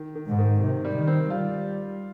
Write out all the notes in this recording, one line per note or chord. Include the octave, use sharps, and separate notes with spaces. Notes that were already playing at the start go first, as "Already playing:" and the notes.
Already playing: D#3
D#3
G#2
D#3
C3 D#3
G3
D#3
C4
G3 F4